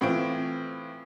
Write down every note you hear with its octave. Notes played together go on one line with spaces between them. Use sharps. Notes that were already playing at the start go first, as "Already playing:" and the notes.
A2 E3 C4 F4 D7